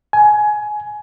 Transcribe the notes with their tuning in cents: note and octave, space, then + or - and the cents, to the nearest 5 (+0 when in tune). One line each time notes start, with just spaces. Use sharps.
G#5 +20